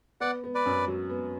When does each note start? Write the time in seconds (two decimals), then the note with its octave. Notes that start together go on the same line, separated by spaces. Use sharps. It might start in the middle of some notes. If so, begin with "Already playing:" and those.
0.20 B3 D5 F#5
0.44 B3
0.55 B4 D5
0.66 F#2
0.88 F#3
1.10 B3